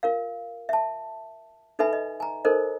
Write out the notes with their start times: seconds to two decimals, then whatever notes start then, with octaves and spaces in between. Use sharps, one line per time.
0.03 F4 A#4 F5
0.69 E5 A5
1.79 D#4 A4 B4 E5 G#5 B5
1.93 D#5
2.20 G#5 A#5
2.45 D#4 A4 A#4 C5 D#5